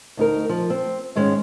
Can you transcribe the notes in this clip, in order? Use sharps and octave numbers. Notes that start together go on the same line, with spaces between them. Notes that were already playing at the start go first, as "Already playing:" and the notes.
D2 D#4 A#4
F3
C4
G#2 D#3 G#3 C#4